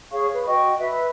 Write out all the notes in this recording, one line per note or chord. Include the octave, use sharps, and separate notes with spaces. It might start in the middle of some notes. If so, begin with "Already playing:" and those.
G#4 C#5 F5 C#6
B4
F#4 D#5 G5 C#6
B4 E5